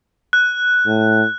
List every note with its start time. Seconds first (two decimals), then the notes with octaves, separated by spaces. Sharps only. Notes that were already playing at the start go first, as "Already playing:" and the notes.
0.33 F#6
0.87 A2